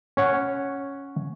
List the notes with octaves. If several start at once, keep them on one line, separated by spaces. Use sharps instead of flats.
C#4 C#5 F#5